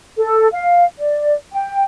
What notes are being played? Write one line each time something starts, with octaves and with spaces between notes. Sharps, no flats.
A4
F5
D5
G5